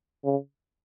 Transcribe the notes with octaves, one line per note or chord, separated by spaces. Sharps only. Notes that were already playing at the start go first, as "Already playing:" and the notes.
C#3